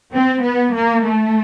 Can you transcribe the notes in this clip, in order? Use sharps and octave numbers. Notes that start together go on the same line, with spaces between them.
C4
B3
A#3
A3